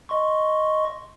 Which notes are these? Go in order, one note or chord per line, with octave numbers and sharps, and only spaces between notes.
D#5 C6 C#6